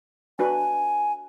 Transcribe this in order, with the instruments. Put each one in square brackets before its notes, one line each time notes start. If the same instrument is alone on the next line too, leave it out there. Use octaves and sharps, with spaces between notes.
[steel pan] D4 F#4 B4 [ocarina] G#5